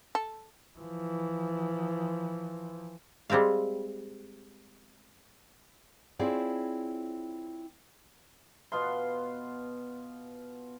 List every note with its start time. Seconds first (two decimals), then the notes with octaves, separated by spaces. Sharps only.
0.15 A4
0.79 E3 F3
3.30 G3 G#3 C4 E5 F5
6.19 C4 E4 F4 G#4 C#5 D5
8.72 B2 B3 F4 C6